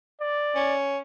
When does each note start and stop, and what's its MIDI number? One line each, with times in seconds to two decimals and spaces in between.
0.21 0.75 74
0.55 0.98 61